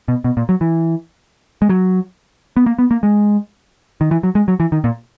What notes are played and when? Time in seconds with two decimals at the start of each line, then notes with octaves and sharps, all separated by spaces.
0.08 B2
0.24 B2
0.37 A#2
0.49 F#3
0.61 E3
1.62 G#3
1.69 F#3
2.57 B3
2.66 A#3
2.79 B3
2.91 A#3
3.03 G#3
4.01 D#3
4.11 E3
4.23 F#3
4.35 G#3
4.48 F#3
4.60 E3
4.72 D#3
4.84 A#2